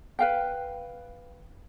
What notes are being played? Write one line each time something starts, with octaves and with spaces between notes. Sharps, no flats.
B4 F5 G5